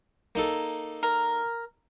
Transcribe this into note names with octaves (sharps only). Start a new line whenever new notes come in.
A#3 D#4 A4
A#4